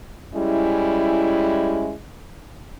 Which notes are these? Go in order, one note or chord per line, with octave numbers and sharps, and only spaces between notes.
G3 G#3 C#4 E4